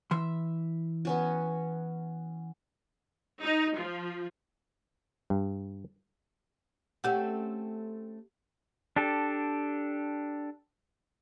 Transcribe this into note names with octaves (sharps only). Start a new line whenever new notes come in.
E3 E5 C6
B3 C#4 F#4
D#4
F3
G2
A3 C4 C#4 G4 F#5
D4 G4 A4